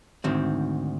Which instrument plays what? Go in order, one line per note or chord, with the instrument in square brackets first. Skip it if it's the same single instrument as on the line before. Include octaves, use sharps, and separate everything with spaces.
[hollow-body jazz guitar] D2 G#2 D#3 C4